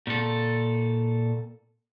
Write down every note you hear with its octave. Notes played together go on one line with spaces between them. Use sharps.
A#2 A4